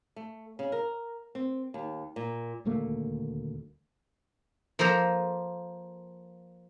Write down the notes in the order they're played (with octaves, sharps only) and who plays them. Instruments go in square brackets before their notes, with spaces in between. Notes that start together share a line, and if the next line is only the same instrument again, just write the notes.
[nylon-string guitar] A3
C#3
A#4
C4
D#2
A#2
[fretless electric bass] D#1 D2 A3 A#3
[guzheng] F3 A#3 A4 C5 A#5